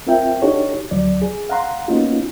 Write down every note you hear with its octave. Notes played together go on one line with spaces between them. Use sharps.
C4 F4 A#4 E5 G5
D4 D#4 F#4 G4 A4 C#5
D2 F#3 D5
G#4
F5 F#5 A#5 C6
A#3 B3 C#4 D#4 F4 F#4